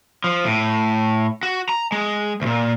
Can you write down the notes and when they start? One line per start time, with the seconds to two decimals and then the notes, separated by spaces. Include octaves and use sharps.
0.24 F3
0.46 A2
1.43 F#4
1.69 A#5
1.92 G#3
2.42 D2 A#2